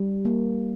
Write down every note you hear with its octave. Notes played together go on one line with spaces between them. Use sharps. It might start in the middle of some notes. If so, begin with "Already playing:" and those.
Already playing: G3
A#3